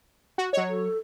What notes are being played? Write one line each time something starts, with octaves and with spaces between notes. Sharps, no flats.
F#4
F#3 C#5 D#5
A4